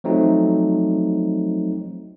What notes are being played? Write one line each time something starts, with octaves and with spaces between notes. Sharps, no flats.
F3 F#3 A3 C4 D#4